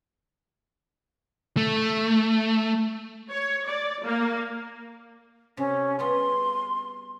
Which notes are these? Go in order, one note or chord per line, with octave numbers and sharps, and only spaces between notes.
A3
C#5
D5
A#3
C3 C#4
G3 B3 G#4 C6